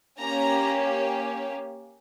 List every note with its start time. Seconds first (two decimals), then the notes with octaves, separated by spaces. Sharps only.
0.20 A#3 C#4 G4 A#5